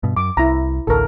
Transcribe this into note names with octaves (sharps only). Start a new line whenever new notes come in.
G2 B2
F#2 D6
C2 E4 A#5
A1 D2 A4 A#4